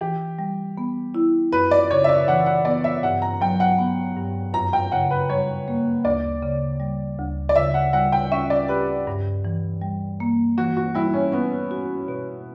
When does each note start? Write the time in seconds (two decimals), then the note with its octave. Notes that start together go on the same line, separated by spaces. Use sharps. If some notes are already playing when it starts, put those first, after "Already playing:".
0.01 E3 G4
0.39 G3
0.78 B3
1.15 E4
1.52 F#2 B4
1.71 D5
1.91 C#3 C#5
2.04 E5
2.09 D5
2.28 E3 F#5
2.46 F#5
2.65 B3 D5
2.84 E5
3.03 G2 F#5
3.22 A#5
3.41 F#3 G5
3.60 F#5
3.78 B3
4.17 G2
4.53 F#2 A#5
4.73 G5
4.92 C#3 F#5
5.11 B4
5.29 G3 C#5
5.68 A#3
6.04 D2 D5
6.42 C#3
6.80 G3
7.19 D2
7.49 D5
7.56 C#3 E5
7.74 F#5
7.93 G3 F#5
8.12 G5
8.32 C#4 E5
8.50 D5
8.68 G4 B4
9.07 G2
9.45 E3
9.82 G3
10.20 A#3
10.58 E3 F#4
10.77 F#4
10.95 G3 E4
11.14 C#4
11.32 B3 C#4
11.71 F#4
12.08 B2